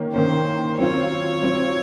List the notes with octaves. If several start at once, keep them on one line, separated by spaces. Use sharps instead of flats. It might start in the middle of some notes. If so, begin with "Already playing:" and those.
Already playing: D#3 A#3 C#4
D#3 A#3 C#4 C5
F#3 C4 F4 C#5
F#3 C4 F4